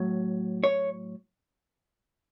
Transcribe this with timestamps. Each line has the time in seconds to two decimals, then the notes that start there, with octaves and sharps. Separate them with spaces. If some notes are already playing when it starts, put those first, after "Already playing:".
Already playing: A2 F#3
0.64 C#5